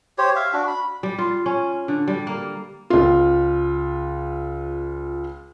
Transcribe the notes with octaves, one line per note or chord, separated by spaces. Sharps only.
G4 C5 C#5
E5 F5
D4 F#4
B5
G3
F4
C#4
D3
G3
A#3
C#2 F4